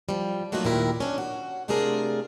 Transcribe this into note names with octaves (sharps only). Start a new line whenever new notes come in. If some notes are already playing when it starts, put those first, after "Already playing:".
F3 G3
F#3 A3 A#3 D#4 F4 F#4
D#2 A#2 D#3 E4 A#4
C#4 D4
F#4
C3 A3 D4 F4 G#4 A#4